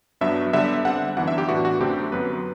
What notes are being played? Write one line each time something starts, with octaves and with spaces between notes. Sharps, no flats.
G2 F#3 B3 D4 E5
D3 G3 B3 E5
D3 G3 C4 F#5
F#2 E3 B3 D4 F#5
E5
G4
A2 E3 B3 D4 F#4
F#4
F#2 D3 A3 C4 G4
F#2 F#3 B3 B4